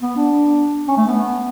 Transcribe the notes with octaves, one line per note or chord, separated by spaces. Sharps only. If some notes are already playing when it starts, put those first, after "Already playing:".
B3
D4
C#4
A3
B3